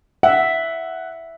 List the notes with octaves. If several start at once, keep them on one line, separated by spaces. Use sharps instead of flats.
E5 F#5